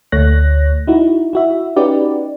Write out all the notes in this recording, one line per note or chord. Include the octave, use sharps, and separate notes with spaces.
D2 A3 C#5 F#6 A#6
D#4 E4 F#4
E4 F#4 E5
C#4 D#4 F#4 G4 B4 D5